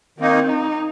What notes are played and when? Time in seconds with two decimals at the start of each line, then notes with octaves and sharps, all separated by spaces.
0.19 D#3 A#3 C4 D#4
0.49 D#4